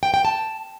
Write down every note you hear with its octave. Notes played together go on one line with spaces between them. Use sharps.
G5
G5
A5